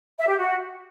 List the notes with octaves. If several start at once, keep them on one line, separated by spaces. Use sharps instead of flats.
E5
G4
F#4